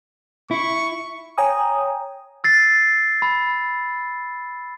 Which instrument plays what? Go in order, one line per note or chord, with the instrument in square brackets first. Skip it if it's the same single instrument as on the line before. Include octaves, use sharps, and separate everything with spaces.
[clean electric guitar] E4 [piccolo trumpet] C#6
[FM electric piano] C#5 G5 G#5 A#5 D#6
[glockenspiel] E6 A6 C7
B5